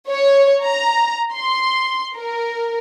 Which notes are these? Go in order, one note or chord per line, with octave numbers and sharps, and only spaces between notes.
C#5
A#5
C6
A#4